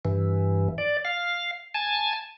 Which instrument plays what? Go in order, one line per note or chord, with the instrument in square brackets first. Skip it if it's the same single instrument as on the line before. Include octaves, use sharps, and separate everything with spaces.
[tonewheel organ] G2 E3
D5
F5
G#5 A5